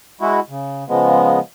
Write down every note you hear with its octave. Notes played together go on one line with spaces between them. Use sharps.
G#3 E4 F#4
C#3
C#3 F3 G#3 B3